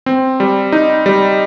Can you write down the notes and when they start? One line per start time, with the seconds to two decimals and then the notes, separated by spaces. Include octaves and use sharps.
0.06 C4
0.40 G3
0.72 D#4
1.06 G3